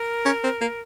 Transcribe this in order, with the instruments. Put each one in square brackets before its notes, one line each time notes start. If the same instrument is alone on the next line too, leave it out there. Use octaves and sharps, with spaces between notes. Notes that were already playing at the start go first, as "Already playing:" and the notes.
Already playing: [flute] A#4
[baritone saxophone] C#4
C4
A#3